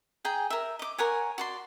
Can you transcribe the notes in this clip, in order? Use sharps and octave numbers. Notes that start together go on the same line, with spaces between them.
G#4 G5 G#5 A#5
A#4 E5
D#5 D6
A#4 C#5 F#5 G#5
F#4 D5 C6